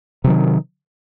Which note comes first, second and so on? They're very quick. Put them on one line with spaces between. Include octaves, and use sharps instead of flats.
C3 F#3 D#3